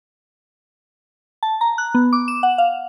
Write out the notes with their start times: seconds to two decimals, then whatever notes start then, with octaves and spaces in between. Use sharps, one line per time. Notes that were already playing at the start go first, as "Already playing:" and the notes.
1.43 A5
1.61 A#5
1.78 F#6
1.95 B3
2.13 D6
2.28 E7
2.43 F#5
2.58 F5